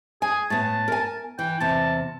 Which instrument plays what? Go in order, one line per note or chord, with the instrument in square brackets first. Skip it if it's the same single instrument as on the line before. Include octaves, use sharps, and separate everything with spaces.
[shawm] G#4 [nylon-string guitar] G#5
[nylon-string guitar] A2 B3 [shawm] A5
[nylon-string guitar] A#4 G#5
[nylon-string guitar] E3 [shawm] G5
[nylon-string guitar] E2 C3 [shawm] A5